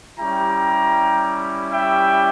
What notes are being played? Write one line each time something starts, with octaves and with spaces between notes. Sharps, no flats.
G3 C#4 E4 G4 G5 A#5
E5 G5